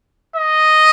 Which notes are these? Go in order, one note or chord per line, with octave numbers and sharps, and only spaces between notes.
D#5